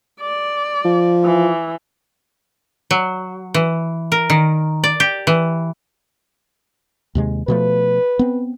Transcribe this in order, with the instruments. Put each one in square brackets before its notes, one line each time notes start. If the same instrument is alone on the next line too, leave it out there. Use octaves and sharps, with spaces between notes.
[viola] D5
[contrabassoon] F3
[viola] E3
[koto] F#3
E3
A#4
D#3
D5
G4
E3
[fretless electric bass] D#2 C3 G#3
[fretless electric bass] B2 F3 A3 [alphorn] B4
[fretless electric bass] B3 C4